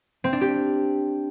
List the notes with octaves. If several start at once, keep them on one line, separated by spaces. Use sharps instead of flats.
C4
D4
G4